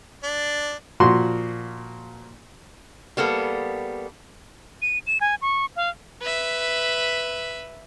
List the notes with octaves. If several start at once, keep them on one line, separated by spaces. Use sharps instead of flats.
D4
A#2 F3 F#4 C6
G3 A#3 B3 A4
D#7
E7
G#5
C#6
F5
B4 E5